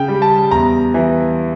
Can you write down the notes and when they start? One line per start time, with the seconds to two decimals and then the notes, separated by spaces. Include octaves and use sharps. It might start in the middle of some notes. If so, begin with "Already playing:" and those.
Already playing: C#3 G5
0.08 G3
0.22 A5
0.51 E2 A#5
0.94 E3